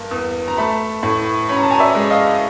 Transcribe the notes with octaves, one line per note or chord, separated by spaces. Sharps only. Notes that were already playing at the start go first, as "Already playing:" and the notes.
Already playing: G2 A#3
E2
A#5
A3 A5 B5
A2
C#4 B5
A#5
A5
G#5 A#5
D5 E5
G#3
D#5 F5